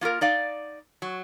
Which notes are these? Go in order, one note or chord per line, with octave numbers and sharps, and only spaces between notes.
A#3 F4 G4 A#4
D#4 D5 F5
F#3